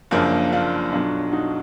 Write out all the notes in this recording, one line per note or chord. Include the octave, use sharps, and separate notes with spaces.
F#1 F#2 F3 A#3 D4
D4 F4
B1 B2 F#3 D4 F4
D#4 F#4